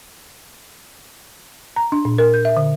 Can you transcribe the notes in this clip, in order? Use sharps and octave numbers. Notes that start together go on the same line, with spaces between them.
A#5
D4
A#2
A#4
G6
E5
D3